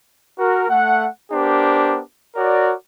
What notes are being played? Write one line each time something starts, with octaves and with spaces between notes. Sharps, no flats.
F#4 A#4
A3 F#5
B3 D4 G4 A#4 C5
F#4 A#4 C#5 D5